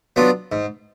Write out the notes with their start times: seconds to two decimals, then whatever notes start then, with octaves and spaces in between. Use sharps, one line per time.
0.16 F#3 B3 D4 F4
0.52 G#2